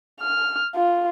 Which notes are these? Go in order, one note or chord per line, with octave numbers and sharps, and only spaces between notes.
F6
F4